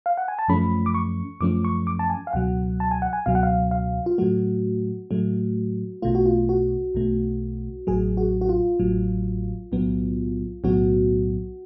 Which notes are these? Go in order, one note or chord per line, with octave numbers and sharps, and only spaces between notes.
F5
F#5
G#5
A5
F#2 F3 A3 C#4 B5
D6
C#6
F#2 F3 A3 C#4 D6
C#6
D6
A5
G#5
F5
C#2 B2 F#3 F#5
A5
G#5
F#5
G#5
C#2 B2 F#3 F5
F#5
F5
F5
F4
A2 F#3 A3 F#4
A2 F#3 A3
B1 B2 A3 F4
F#4
F4
F#4
B1 B2 A3
A1 A2 F#3 G#4
F#4
F#4
F4
A1 A2 F#3
B1 A2 F#3 B3
B1 A2 F#3 B3 F#4